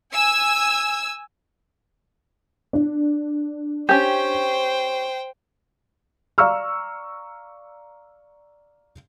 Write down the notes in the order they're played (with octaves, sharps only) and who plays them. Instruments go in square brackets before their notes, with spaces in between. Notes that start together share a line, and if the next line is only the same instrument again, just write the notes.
[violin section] G#5 E6
[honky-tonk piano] D4
[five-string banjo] C#4 G4 [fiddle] C5 G5
[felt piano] D5 F5 A#5 C#6 E6 F6